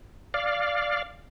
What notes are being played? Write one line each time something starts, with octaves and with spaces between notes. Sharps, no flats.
D5 F5